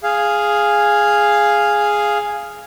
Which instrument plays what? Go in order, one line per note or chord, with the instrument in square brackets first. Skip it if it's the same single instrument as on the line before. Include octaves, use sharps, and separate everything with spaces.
[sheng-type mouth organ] G#4 F5